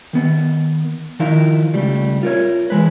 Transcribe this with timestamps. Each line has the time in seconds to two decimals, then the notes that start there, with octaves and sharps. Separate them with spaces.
0.13 D#3 B3
1.20 D#3 F3 D#4 E4 A#4 F5
1.73 C#2 G3 A3
2.23 F4 A#4 C#5
2.70 E3 G#3 B4